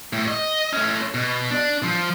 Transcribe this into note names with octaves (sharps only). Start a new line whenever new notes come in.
A2
D#5
A3 C#4
B2
D4
F3